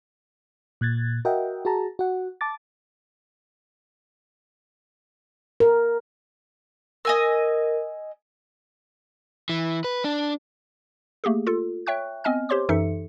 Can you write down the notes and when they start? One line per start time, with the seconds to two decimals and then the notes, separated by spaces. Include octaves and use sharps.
0.81 A#2 F#6 G#6 A6
1.25 F#4 A#4 D#5 E5 F#5 G5
1.65 F#4 G#4 A5 A#5
1.99 F#4 F#5
2.41 A5 D6 A6
5.60 A#4
7.05 A#4 D#5 G#5 E6
9.49 E3
9.84 B4
10.04 D4
11.24 A3 A#3 G4 G#4
11.47 F4 A4
11.86 C#5 E5 G5 C#6 F#6
12.24 B3 C4 D#5 G#5 F6
12.49 G4 C5 C#5 C6 D6
12.69 F#2 E3 D#4 A4 E5 C#7